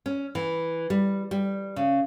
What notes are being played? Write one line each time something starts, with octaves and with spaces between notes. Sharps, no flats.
C#4
E3
G3
G3
C#3